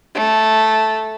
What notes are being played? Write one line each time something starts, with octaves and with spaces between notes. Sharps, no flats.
A3